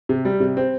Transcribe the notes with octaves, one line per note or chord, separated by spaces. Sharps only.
C3
G3
C3
C4